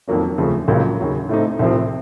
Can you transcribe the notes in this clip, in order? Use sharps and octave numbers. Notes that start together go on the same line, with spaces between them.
F2 D#3 F#3 A#3 C#4
D#2 C#3 F3 A3
C#2 C#3 F#3 A#3 F4
D#2 C#3 F#3
A2 A3 C4 D#4
C2 C3 F3 C4